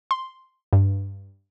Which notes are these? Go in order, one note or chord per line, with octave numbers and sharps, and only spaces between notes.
C6
G2